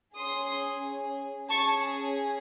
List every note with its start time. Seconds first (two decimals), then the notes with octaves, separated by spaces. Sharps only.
0.16 C#4 G#4 C6 D#6
1.49 C#4 G#4 A5 C#6